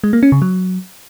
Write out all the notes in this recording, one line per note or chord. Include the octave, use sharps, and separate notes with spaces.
G#3
A#3
C#4
C#3
F#3